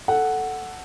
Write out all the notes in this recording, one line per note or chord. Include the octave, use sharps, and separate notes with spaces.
A4 F#5